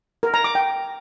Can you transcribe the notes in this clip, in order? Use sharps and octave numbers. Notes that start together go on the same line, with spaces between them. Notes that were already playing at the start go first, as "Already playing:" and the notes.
A#4
A#5
D6
G5